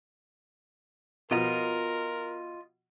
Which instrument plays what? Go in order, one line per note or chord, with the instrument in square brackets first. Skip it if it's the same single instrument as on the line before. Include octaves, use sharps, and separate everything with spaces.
[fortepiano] B2 F3 [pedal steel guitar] F4 D#5 A#5 [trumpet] A#4